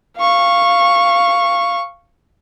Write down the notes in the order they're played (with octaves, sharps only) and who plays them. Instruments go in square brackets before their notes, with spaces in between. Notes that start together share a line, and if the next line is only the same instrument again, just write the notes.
[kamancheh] F5 C#6